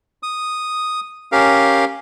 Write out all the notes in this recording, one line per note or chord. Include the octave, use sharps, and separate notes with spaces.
D#6
C#4 G4 A#4 F5